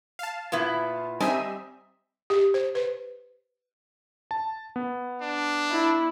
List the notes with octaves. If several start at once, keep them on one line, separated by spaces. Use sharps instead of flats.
F5 A5
A#2 B3 E4
G3 C4 D#4 D#5 E5 G#5
G4
C5
B4
A5
B3
D4
E4